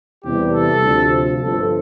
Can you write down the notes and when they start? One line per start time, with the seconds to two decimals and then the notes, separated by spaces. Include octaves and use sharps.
0.24 E2 C3 E3 G3 G4
0.53 A4
0.83 D2 C3 F3
1.41 G1 G2 F3 A4